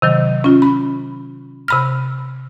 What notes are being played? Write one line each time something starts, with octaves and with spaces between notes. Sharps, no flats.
C3 D#3 F#3
C#4 F4
B5
C3 B5 F6